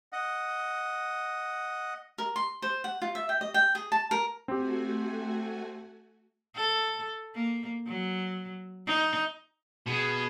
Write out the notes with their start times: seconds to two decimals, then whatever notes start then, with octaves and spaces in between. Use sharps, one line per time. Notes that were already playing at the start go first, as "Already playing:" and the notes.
0.13 D#5 F#5
2.18 A#4
2.36 C6
2.62 C5
2.84 F#5
3.02 F4
3.15 E5
3.29 G5
3.41 D#5
3.54 G5
3.75 G#4
3.92 A5
4.11 A#4
4.48 A3 C4 F#4 G4 G#5
6.55 A4
7.35 A#3
7.87 F#3
8.87 D#4
9.86 B2 G#4